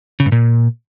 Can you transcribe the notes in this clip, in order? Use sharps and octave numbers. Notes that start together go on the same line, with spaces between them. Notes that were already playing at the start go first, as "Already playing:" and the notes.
C#3
G2
A#2